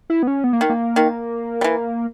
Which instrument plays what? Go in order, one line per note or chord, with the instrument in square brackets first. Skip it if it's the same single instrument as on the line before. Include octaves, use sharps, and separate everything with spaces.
[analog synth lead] E4
B3
C#4
B3
A#3
[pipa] D#3
[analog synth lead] A#3
[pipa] D#3
G3
E3